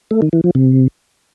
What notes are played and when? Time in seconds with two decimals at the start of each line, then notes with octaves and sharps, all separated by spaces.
0.11 A3
0.22 D#3
0.33 E3
0.44 F3
0.55 C3